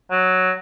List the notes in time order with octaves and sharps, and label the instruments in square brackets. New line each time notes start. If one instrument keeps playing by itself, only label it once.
[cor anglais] F#3